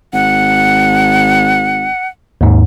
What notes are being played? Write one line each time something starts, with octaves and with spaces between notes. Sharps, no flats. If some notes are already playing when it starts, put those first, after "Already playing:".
G#1 F#5
D#2 G#2